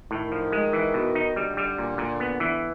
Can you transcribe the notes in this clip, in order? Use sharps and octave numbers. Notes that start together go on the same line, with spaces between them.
A2 D#3
F3
G#3
E3
B2
D#4
D3 G3
G3
A#2
A#2
B3
E3